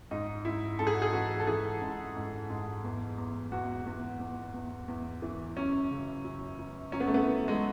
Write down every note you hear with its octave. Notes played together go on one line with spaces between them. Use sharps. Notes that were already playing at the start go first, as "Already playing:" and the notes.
G#2 D#4
G#2 E4
G#2 A4
G#4
F#4
G#4
E3 F#4
A4
E3 G#4
G#2
G#2
G#2
E2
E2
E2 F#4
E2
E2
E2
E2
E3
F#2 C#4
C#3
F#2
F#2
F#2 C#4
B3
A3
B3
E3
G#3